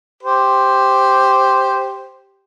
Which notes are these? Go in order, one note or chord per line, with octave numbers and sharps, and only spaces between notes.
G4 C5